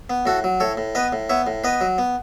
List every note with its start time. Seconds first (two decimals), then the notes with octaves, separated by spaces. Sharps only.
0.10 B3
0.26 A2 F#4 A4
0.44 F#3
0.60 A2 A4 C#5
0.77 A2
0.95 B3 B4 D#5
1.13 A2
1.29 B3 C#5 E5
1.47 A2
1.64 B3 B4 D#5
1.81 F#3
1.98 B3